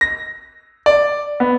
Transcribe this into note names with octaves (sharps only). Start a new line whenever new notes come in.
A#6
D5
B3